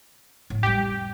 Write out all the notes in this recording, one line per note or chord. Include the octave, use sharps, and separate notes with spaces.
A2
F2 G3 G4